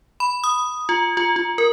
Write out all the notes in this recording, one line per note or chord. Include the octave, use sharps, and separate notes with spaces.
B5
D#6
F4
F4
F4
A#4